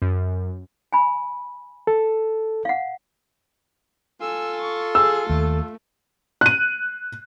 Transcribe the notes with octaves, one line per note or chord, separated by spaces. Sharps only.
F#2
G#5 B5
A4
F5 F#5
F4 A4 G#5 E6
C#6
G#4 E6
D#2 A3
F#6 D#7